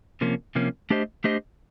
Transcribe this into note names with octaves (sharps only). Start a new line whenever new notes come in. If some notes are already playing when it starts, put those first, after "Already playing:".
C3 F3 A#3 C#4
C3 F3 A#3 C#4
A3 D4 G4 C5 D#5
A3 D4 G4 C5 D#5